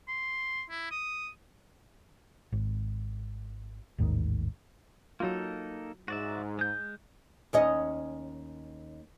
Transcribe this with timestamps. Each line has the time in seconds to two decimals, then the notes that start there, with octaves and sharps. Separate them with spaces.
0.08 C6
0.70 E4
0.91 D#6
2.52 G#1
3.98 A1 D#2 G#2 D#3
5.20 F#3 A#3 D#4 F4 A4
6.08 G#2 F#4 D5 E5
6.59 G#3 G6
7.53 D#2 C#4 D#5